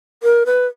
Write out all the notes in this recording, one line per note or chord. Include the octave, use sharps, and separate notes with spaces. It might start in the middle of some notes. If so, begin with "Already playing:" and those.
A#4
B4